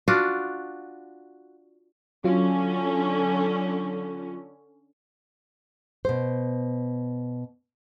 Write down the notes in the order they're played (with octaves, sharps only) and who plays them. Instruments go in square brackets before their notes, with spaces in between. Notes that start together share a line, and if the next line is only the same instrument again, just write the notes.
[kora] D4 F4 F#4
[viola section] D3 C#4 [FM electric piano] F#3 F4
[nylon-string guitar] B2 C5